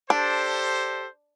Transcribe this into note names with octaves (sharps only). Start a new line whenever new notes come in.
D4 G4 A4 C5